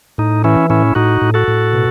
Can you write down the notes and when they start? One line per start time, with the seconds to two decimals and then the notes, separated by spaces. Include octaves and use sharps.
0.18 A2 D#4
0.44 E3 C#4 E4
0.70 A2 C#4 E4
0.95 A2 D#4 F#4
1.22 A2
1.34 F#4 A4
1.48 A2
1.73 B2